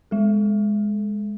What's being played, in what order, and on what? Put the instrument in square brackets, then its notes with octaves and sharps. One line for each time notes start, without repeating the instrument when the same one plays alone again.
[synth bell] G#3 A4